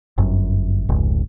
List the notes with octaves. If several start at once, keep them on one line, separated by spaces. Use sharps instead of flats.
G1 F#2
F1 C#2 G#2